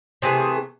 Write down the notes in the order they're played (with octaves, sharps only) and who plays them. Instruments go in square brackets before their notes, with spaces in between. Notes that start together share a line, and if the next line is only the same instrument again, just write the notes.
[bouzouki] C3 E3 A3 G#4